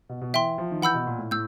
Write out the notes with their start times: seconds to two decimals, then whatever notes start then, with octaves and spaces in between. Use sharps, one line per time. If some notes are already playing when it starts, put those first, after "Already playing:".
0.09 B2
0.21 B2
0.33 E3 E5 G5 C6
0.58 F3
0.72 D#3
0.82 E3 F#5 B5 E6 G6
0.94 B2
1.07 A#2
1.18 A2
1.31 A2 E6 G6